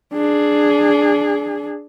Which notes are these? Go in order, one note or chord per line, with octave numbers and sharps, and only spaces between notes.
D4 G#4